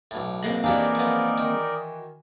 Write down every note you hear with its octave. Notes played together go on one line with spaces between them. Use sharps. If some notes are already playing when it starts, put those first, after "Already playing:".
B1 A2
G#3 A#3 C4
E3 D4 D#4 F#4 G4 A#4 D5 F5
F3 B3
D#3